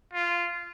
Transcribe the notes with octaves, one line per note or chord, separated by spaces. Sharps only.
F4